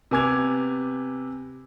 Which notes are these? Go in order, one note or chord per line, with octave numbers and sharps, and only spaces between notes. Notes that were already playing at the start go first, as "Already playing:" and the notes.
C3 B3 G#5 D6 G#6 F7